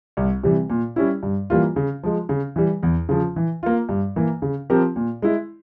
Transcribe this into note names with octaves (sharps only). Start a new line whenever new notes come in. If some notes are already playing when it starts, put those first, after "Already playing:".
C2
C3 E3 G3
A#2
G3 C#4 E4
G2
E3 G3 A#3 F4
C#3
F3 G#3
C#3
E3 G3
E2
C#3 F3
E3
A#3 F4
G2
E3 A#3
C#3
F3 C4 G4 A#4
A#2
G#3 E4